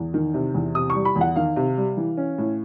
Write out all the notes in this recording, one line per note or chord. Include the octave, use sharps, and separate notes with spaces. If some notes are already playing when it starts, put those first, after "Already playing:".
Already playing: E2
D#3
C3
E2
C3 D#6
C#6
G3
B5
E2
F#5
D#3 F5
C3
G3
E3
C#4
A2